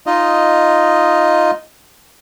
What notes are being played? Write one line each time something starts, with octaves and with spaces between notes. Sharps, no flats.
D#4 F4 D#5